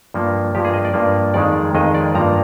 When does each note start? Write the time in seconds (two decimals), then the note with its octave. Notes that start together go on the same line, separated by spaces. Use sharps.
0.14 G2 F3 A#3
0.55 G2 F3 A#3 G4
0.65 G#4
0.74 D#5
0.85 D5
0.94 G2 F3 A#3
1.34 F2 D#3 G#3 D5
1.75 F2 D#3 G#3 D#5
1.95 D5
2.15 G2 F3 A#3 A#5